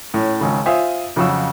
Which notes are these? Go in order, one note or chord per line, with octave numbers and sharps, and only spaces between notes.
A2 C#4
G#1 C#3
F4 C5 E5 F5 G#5 D#6
F2 C#3 F#3 F#4 F5 E6